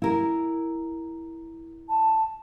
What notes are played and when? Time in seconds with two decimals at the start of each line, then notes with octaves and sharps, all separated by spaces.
0.02 E4 A#4
1.89 A5